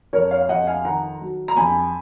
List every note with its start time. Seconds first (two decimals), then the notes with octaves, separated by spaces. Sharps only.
0.13 F2 A#4 C#5
0.31 C#5 F5
0.41 F5
0.49 F2 D#5 F#5
0.67 F5 G#5
0.85 D#3 F#5 A#5
1.21 F#3
1.48 A#5
1.56 F2 G#5 B5